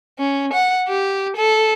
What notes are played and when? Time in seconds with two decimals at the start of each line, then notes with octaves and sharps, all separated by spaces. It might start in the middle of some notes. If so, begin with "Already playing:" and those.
0.19 C#4
0.53 F#5
0.89 G4
1.37 A4